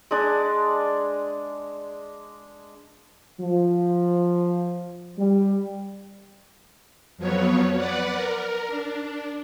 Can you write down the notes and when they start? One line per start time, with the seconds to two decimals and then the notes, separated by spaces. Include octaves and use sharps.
0.11 G#3 D4
3.40 F3
5.17 G3
7.17 F2 F3 F#3 B3 C#5
7.75 B4 D5 F#5
8.11 A#4
8.67 D4